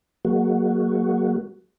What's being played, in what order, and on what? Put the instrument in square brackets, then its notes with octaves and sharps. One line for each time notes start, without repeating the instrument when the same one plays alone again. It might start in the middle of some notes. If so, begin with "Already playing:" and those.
[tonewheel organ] F#3 G#3 A#3 F#4